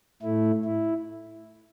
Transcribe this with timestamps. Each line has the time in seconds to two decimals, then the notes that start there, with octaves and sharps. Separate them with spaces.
0.22 A2 A3 E4
0.64 E4